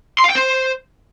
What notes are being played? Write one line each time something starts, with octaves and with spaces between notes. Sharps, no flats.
C6
F5
G5
C5